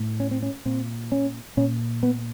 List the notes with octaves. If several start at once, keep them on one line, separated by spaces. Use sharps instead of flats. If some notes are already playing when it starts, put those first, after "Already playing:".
Already playing: A2
C#4
C4
C#4
A#2 C4
C#4
A#2 C#4
B3